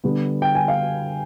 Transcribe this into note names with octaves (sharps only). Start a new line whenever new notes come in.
D3 G3 B3
G5
G#5
F5